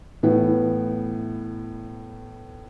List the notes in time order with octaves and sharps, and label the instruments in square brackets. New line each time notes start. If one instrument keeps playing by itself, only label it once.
[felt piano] A2 E3 B3